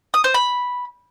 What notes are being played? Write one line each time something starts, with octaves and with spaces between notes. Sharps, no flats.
D#6
C5
B5